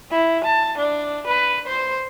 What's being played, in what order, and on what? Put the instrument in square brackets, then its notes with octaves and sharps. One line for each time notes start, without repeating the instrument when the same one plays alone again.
[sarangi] E4
A5
D4
B4
C5